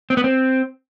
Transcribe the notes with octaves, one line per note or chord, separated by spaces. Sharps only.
C4
B3
C4